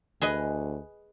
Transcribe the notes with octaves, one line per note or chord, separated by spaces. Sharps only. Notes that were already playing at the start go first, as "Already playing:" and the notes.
D2 G#4 B4 D#5